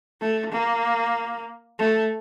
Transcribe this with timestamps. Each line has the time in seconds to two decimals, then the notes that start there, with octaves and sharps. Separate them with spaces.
0.21 A3
0.52 A#3
1.79 A3